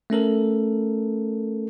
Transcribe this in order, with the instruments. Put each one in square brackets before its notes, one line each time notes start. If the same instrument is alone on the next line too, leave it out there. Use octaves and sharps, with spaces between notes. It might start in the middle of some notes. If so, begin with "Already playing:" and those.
[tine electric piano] A3 C#4 A4 A#4